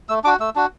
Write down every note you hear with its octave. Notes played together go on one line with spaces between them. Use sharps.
A3 E6
D4 F#4 D6
A3 E6
D4 F#4